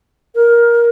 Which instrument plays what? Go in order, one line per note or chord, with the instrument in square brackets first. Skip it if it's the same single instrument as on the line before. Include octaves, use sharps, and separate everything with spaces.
[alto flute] A#4